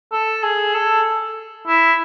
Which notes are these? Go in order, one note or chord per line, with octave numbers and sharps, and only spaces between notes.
A4
G#4
A4
E4